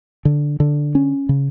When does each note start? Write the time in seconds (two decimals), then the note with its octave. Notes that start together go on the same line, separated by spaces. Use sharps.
0.25 D3
0.60 D3
0.95 C#4
1.29 C#3